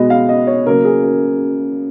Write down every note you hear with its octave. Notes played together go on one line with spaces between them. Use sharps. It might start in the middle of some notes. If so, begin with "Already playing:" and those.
Already playing: B2 G#3 B3 D#5
F5
D#5
C#5
C#3 F#3 A#3 A#4
G#4
A#4